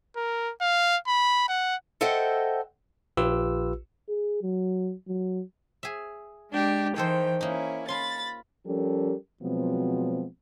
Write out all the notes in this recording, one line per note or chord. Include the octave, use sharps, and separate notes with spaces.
A#4
F5
B5
F#5
A4 C5 D#5 E5 F#5 G5
A#1 F4 G4 B4 E6
G#4
F#3
F#3
G#4 E5
G#3 D4 G4
D#3 E3 G#4 A4 C5 G5
A#3 C#4 D#4 E4
F4 B5 C6 A6
F3 G3 C#4 G4 A4 A#4
B2 F3 F#3 G#3 B3 C4